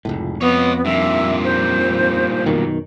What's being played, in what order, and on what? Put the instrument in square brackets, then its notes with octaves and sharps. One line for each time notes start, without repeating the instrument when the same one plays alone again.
[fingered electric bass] F1 C#2 A2
[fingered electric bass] F2 [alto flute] B3 [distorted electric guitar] C#5 D#5
[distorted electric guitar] G2 A#2 [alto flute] E5
[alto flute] C5
[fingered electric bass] F#2 B2 D#3